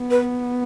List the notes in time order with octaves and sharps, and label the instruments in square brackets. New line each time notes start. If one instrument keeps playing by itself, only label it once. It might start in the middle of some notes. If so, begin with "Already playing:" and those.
Already playing: [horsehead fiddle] B3
[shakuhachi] B4